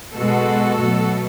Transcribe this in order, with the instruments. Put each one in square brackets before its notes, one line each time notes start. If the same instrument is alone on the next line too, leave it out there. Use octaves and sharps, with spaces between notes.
[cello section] B2 G#3 B3 F#4 A4
B2 F#3 A3